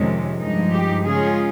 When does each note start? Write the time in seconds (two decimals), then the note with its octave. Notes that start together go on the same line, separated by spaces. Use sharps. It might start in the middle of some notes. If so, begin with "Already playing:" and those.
Already playing: F2 C3 D#3 G#3 C#4
0.40 G2 F3 G#3 D#4
0.73 G4
1.04 C#3 G#3 C#4 F4 G#4